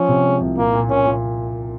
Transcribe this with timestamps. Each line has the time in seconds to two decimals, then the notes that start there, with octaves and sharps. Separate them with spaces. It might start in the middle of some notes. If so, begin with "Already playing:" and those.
Already playing: F3 C#4
0.09 C3
0.26 G#3
0.41 C2
0.57 A#2 A#3
0.74 A#2
0.90 A#2 C#4
1.06 A#2